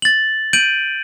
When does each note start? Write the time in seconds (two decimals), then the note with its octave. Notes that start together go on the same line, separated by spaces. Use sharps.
0.02 A6 F#7
0.53 G6 D7 D#7 F#7